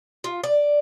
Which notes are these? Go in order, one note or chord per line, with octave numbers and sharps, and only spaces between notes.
F4
D5